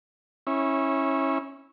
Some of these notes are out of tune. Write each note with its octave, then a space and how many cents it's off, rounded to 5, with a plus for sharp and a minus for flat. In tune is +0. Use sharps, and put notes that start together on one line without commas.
C#4 -20 E4 -20 C#5 +0